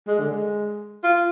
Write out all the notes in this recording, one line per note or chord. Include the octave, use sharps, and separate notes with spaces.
G#3
D3
G#3
F4